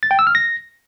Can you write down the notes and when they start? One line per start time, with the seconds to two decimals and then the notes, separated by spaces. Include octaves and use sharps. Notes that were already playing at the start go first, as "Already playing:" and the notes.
0.03 A6
0.11 G5
0.19 E6
0.27 F6
0.35 A#6